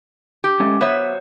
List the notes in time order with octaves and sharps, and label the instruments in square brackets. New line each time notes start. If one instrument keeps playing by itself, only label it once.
[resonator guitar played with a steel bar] G4
[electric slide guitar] G#3 A3 C#4
[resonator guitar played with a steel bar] B3 E5 [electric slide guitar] F#4 C5 C#5